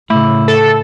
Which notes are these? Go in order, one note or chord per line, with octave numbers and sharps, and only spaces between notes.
A2 C#3 A3 E4
A4